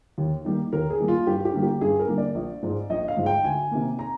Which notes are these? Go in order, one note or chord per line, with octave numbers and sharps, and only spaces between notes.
D#2
D#3 G3 A#3
D#2 A#4
G#4
D#3 G3 A#3
F4
G2 G4
G4
D3 G3 A#3
G4
G2 G#4
A#4
D3 G3 A#3
D5
A#1
G#2 F3 G#3
A#1 D#5
F5
G#2 F3 G#3
G5
D2 G#5
C3 D#3 A#3
A#5